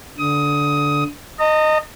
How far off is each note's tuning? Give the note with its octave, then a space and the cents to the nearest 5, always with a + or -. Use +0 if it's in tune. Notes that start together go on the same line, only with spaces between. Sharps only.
D3 -15 D#6 +15
D#5 -10 A#5 -45